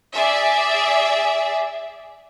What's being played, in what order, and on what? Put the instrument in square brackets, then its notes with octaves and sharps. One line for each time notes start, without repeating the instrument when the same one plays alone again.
[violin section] G#4 D5 E5